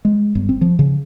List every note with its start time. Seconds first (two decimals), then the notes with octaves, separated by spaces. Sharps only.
0.05 G#3
0.35 G1
0.49 C4
0.61 F3
0.79 C#3